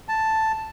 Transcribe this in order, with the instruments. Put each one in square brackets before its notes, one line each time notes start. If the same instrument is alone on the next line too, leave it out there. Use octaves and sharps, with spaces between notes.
[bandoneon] A5